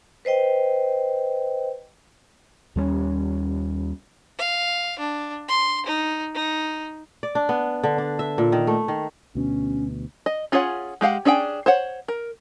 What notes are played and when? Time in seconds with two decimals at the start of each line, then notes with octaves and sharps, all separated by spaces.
0.25 B4 C5 D#5 G5
2.76 D#2 G3 G#3 C#4
4.39 F5
4.99 D4
5.48 C6
5.86 D#4
6.35 D#4
7.23 D5
7.35 D4
7.49 B3
7.83 D3
7.98 D4
8.19 E5
8.38 A#2
8.52 D#3
8.67 A3
8.88 D#3
9.35 D2 B2 C#4
10.26 D#5
10.52 C#4 F4 G#4 C#5 F#5
11.01 G#3 G4 F5 F#5
11.25 C#4 D4 G#4 E5 G5
11.66 C5 C#5 F#5
12.08 A#4